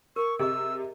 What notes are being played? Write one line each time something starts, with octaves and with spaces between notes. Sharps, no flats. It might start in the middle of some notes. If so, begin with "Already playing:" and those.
A#4 C#6
C3 G#4 D#5 C#6 E6